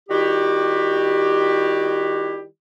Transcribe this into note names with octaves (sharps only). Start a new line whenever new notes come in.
D#3 G3 E4 F#4 G4